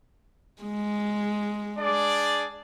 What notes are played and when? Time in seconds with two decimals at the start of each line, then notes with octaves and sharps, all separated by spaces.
0.62 G#3
1.79 D4 G#4 D5